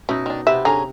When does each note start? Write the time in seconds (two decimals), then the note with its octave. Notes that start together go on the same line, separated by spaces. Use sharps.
0.09 B2 C#4 D#4 E4
0.26 D#3 D4
0.47 C3 B3 C5 E5
0.65 D3 C#4 G#4 A#5